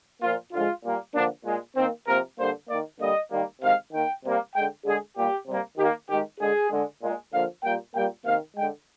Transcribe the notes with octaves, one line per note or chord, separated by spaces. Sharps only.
A#2 F3 A#3 F4
D3 F3 G#3 F4
A#2 G3 A#3
D3 F3 A#3 D4
A#2 G#3
D#3 A#3 C4
C3 F3 A#3 A#4
D3 G3 A#3 C5
D#3 A#3 D5
D3 G3 A#3 D#5
D#3 G3 A#3
C3 D#3 G#3 F5
D#3 A#3 G5
C3 G3 A#3
D3 G#3 G5
D3 G#3 G#4
A#2 G3 A#3 G4
C3 G3 A#3
D#3 A#3 G4
D#3 G#3 G4
D3 G#3 G#4
D3 G#3
A#2 G#3
D3 F3 A#3 F5
A#2 G3 A#3 G5
A#2 G3 A#3 G5
C3 D#3 A#3 F5
D3 G#3 G5